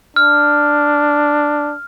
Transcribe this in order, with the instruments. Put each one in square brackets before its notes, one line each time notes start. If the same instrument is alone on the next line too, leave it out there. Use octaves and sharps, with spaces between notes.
[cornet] D4 [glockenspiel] F6